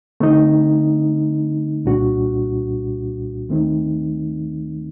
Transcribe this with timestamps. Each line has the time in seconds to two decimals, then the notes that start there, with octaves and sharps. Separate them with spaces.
0.20 D3 A3 C4 D#4
1.85 C2 A#2 G3 D4 F#4
3.48 D#2 D#3 A3 C4 D#4